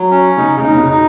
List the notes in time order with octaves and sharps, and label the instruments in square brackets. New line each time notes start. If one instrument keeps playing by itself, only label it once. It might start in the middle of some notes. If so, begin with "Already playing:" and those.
Already playing: [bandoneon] F#3
C#4
[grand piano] C#3 [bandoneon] D#4
[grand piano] C#3
[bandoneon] D#4
[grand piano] C#3
B2
[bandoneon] D#4